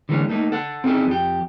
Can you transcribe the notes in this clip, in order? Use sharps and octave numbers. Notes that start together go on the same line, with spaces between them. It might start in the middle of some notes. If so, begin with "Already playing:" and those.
D3 E3 G#3 A#3 C#4
A3 A#3 D#4
A4 F#5
C4 C#4 D#4 E4 G#4 A4
F2 G4